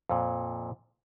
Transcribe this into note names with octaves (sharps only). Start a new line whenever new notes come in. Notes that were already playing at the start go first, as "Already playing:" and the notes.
F2 A#2